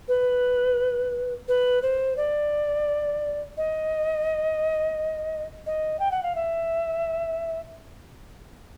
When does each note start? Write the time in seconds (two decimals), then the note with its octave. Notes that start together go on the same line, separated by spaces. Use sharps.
0.08 B4
1.48 B4
1.82 C5
2.17 D5
3.57 D#5
5.66 D#5
5.99 G5
6.11 F#5
6.23 F5
6.36 E5